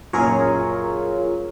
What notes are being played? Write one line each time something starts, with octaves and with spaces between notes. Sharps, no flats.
F#2 A#2 C#4 F4 G#4 A#4 C#5